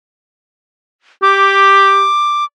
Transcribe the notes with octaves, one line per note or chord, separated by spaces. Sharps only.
G4 D6